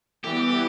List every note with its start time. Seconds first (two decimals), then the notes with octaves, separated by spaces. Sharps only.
0.24 E3 G3 B3 G4